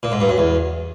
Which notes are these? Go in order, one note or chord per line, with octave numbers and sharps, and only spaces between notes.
A#2
G#2
G2
F#2
E2